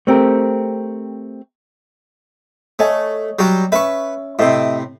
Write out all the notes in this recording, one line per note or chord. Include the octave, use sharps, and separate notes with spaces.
A3 C4 G4 A#4
A3 C#5 D#5 G#5
F#3 G3 F#4
C#4 B4 E5 C#6
A2 C3 C5 D#5 E5